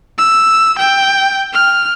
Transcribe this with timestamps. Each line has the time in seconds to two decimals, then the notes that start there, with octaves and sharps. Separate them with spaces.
0.18 E6
0.78 G5
1.53 F6